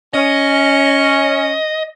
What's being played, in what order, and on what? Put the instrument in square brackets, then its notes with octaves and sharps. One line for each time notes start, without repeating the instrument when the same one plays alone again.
[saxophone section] C#4 [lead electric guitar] D#5